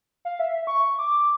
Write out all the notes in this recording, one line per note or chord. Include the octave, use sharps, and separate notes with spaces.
F5
E5
C#6
D6